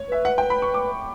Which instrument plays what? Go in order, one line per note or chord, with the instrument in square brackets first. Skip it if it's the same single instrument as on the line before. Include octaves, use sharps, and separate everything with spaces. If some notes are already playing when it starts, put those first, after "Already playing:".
Already playing: [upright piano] C#5
[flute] B4 [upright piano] E5
[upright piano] F#5
G5
B5
C#6
D6